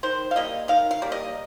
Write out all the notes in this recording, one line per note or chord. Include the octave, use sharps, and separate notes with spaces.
D#3 C5
F5
G3 A#3 D#5
D#3 F5
F5
G3 A#3
D#5